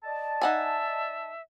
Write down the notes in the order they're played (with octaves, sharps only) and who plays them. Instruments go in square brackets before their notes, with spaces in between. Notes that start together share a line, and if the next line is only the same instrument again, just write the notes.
[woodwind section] D5 D#5 A5
[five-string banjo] D#4 F#5 G#5 [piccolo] E5